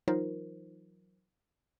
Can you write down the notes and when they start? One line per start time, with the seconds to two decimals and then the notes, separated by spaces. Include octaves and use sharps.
0.08 E3 F#3 D#4 F4 A#4 C5